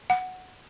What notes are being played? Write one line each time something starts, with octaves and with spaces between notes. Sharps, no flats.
F#5